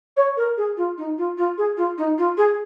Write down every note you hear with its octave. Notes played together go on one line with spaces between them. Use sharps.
C#5
A#4
G#4
F4
D#4
F4
F4
G#4
F4
D#4
F4
G#4